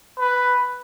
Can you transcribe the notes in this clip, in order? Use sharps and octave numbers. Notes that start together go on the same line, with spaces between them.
B4